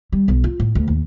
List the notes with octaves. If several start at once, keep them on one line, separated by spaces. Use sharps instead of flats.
G3
B1
F4
A2
D2
D#2